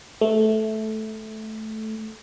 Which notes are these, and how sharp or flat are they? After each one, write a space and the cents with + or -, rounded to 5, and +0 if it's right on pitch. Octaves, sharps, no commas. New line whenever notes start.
A3 -10